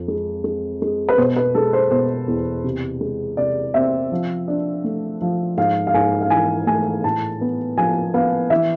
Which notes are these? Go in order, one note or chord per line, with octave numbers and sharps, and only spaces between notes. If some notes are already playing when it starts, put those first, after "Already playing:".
Already playing: F2
G#3
G#3
G#3
B4
B2 C5
B4
G#3 A4
C5
B2 C5
E2
C3
G#3
C3 D5
C4 E5
F3
D4
A3
F3
G#2 F5
F5
G#2 G#5
F5
E3 G#5
A3 G#5
A2 A5
B3
F3 G#5
B3 F5
E3 E5